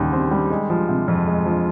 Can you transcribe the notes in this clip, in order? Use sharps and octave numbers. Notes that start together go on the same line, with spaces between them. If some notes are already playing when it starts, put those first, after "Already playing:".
Already playing: D#2 C#3 G3
C4
G3
G#3
F3
C3
F2
G#3
F3